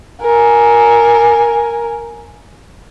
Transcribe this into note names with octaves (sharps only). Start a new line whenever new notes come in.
A#4 G#5